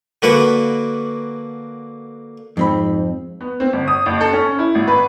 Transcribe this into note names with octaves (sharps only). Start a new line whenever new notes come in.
D3 A#3 F#4 B4
F2 G#2 C4 B5
B3
C4
G1
D#6
F#1
A4
C#4
E4
G#1
B4